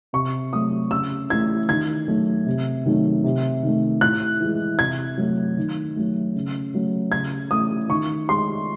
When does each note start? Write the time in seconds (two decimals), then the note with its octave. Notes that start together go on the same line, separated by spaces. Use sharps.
0.13 C3 C#6
0.53 F#3 A3 D#6
0.91 C#3 E6
1.30 E3 A3 G#6
1.69 D#3 G#6
2.08 F#3 A3
2.46 C3
2.86 D#3 F#3 A3
3.23 C3
3.63 D#3 A3
4.01 A2 F#6
4.40 E3 G#3
4.79 C3 G#6
5.17 F#3 A3
5.57 D#3
5.96 F#3 A3
6.35 C#3
6.74 F#3 A3
7.12 C#3 G#6
7.51 E3 A3 D#6
7.89 D#3 C#6
8.28 G#3 C6